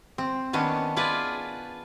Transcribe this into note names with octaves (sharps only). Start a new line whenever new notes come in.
C4
D#3 B3 C#4 D4
F4 G#4 B4 D5